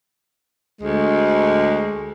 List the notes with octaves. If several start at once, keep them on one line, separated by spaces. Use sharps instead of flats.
D2 G#3